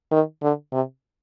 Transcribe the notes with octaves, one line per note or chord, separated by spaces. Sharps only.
D#3
D3
C3